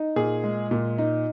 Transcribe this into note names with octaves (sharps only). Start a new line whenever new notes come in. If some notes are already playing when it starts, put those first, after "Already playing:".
Already playing: D#4
A#2 G#4
G#3
A#2
D#4